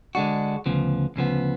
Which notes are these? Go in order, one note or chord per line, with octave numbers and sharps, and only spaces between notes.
D3 G#3 D4 F#4
D2 C#3 F3 B3
D2 C#3 F3 B3